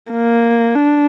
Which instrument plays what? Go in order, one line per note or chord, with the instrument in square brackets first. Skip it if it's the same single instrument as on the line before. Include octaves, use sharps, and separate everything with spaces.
[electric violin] A#3
D4